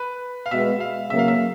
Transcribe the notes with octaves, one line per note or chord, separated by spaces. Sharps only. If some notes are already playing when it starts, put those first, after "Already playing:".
Already playing: B4
F5
B2 G#3 B3 E5
F5
C#3 F#3 A#3 E5
F5
E5